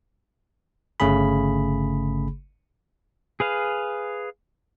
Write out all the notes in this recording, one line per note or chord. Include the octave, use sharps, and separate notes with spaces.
G1 C#3 A3 G#4 B5
G#4 B4 F5